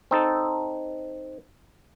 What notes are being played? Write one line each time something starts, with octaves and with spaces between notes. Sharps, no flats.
C4 D#4 A4